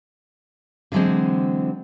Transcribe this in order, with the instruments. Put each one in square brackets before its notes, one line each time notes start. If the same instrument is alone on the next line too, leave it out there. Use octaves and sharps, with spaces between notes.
[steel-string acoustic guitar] D3 E3 F#3 G#3 C4